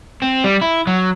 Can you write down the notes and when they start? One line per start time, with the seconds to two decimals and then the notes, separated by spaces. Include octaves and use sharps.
0.22 C4
0.44 G3
0.61 E4
0.87 F#3